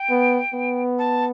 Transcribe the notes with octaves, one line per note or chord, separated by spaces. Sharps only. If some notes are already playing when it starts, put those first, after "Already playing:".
Already playing: G5
B3
B3
A5